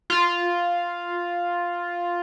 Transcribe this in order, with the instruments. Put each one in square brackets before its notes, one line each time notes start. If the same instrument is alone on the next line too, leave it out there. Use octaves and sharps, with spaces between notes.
[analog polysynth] F4